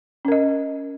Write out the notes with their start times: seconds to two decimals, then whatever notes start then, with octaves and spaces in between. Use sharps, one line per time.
0.25 C#4
0.28 A#4
0.32 D#5